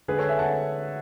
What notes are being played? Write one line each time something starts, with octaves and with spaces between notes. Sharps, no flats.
D3 G#3 G#4 B4
A4 C#5
E5 G#5
F#5 A5